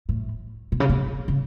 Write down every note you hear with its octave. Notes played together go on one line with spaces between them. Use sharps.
A2
B2
C#3
B2
C#3